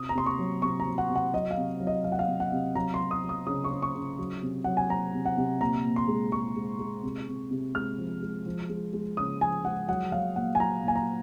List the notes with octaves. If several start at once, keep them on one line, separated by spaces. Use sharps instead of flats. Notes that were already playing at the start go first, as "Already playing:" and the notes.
Already playing: C3 D#6
A#5
C3 C6
C#6
F#3
C3 C#6
A#5
F#3
F#5
C3
F#5
F#3 D#5
F5
C3
F#3
D#5
F#3 F5
F#5
F5
C3
F#5
C3
F#3 A#5
C6
F#3
D#6
F#3
D#6
C#3 D#6
C#6
C#3
C#6
C#3
F#3
C3
F#3 F#5
G#5
F#3 A#5
C3
F#5
C3
A#2 A#5
A#2
C6
G#3
G#3 C#6
G#3
G#3
C3
C3
C3
G#3 F6
F3
G#3
F3
G#3
G#3
C#3 D#6
F3 G#5
G#3 F#5
F#3 F#5
F#3 F5
A#2 F#5
G#5
F#3 A#5
A#2 G#5
A#5